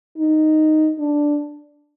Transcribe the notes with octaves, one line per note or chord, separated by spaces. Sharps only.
D#4
D4